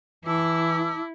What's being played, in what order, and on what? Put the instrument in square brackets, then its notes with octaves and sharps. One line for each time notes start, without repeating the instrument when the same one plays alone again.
[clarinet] E3 [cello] E4 [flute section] A5 D6 E6